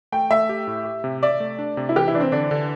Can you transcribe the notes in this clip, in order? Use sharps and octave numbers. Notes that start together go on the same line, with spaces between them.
A3 G5
A3 E5
G4
A2
G4
C3
D5 E5
A3
D4
C3
E4
E3 G4
E4
E3 D4
C4
D3 D4
D3